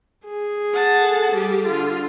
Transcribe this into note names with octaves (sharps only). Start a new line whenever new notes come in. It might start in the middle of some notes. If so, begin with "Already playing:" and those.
G#4
F#5 A5
A4
G3 G4
D3 F4